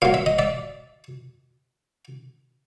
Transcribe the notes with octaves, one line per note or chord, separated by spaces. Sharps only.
A#2 F#3 F5
E5
D#5
D5 E5